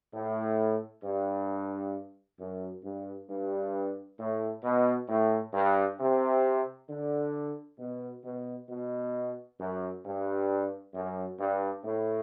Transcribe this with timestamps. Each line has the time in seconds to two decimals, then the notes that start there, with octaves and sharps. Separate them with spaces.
0.13 A2
1.04 G2
2.39 F#2
2.84 G2
3.30 G2
4.20 A2
4.64 B2
5.09 A2
5.54 G2
6.00 C3
6.90 D3
7.79 B2
8.24 B2
8.69 B2
9.60 F#2
10.05 G2
10.95 F#2
11.40 G2
11.85 A2